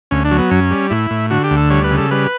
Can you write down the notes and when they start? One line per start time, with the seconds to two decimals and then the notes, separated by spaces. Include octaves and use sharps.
0.11 D2 C#4
0.25 D4
0.31 F#3
0.38 B3
0.51 F#2 C#4
0.71 G3
0.90 A2 E4
1.11 A2
1.30 D3 F#4
1.44 G4
1.51 D2
1.57 A4
1.70 G3 C#5
1.84 B4
1.90 C#3
1.98 A4
2.11 G3 B4